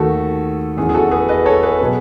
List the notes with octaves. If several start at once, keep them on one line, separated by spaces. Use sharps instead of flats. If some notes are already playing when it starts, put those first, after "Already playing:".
Already playing: D#2 D#3 A3 F#4 A4
F#1 E2 C#3 E3 G#4
G#4
F#4 A4
G#4 B4
B4 D#5
A4 C#5
G#4 B4
B2 F#3 B3